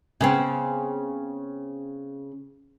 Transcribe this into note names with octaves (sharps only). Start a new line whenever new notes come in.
C#3 B3 C4